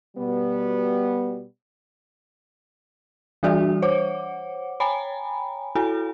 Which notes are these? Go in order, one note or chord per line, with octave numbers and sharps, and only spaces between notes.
B2 G3 B3
E3 G3 D4 F#4 D5 E5
C5 C#5 F#5 D6
C#5 G5 G#5 A#5 B5
E4 F#4 A4 C#5 G#5